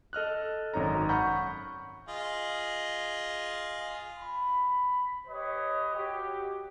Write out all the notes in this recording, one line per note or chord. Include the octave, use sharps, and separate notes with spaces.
A4 D#5 F6 F#6
G#1 F#2 D#4 C#5 A#5
F#5 A#5 B5 C#6 F6 G6
F4 G#4 D#5
B5
G4 B4 C#5 D#5
F#4 G4